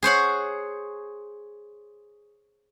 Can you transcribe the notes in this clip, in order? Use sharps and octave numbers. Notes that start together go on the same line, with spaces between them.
G#4 C5 C#5 F#5